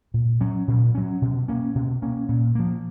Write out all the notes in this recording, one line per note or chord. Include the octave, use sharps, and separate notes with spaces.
A#2
F#3 C#4
A#2
F#3 C#4
B2
A#3 C#4
B2
A#3 C#4
A#2
F3 A#3